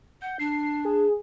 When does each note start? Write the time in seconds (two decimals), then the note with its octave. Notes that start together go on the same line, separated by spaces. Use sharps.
0.22 F#5 G6
0.39 D4 C7
0.85 G#4